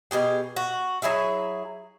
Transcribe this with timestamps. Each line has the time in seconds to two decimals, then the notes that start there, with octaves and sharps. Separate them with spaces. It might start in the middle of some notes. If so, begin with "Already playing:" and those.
0.11 B2 E3 G4 G#4
0.56 F#4
1.02 F#3 E4 G#4 E5